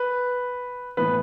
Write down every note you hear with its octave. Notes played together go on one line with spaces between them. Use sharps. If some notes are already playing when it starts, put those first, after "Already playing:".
Already playing: B4
A2 E3 B3 B4